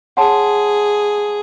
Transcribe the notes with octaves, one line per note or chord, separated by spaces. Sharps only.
G#4 C#5 F#5 A5 C6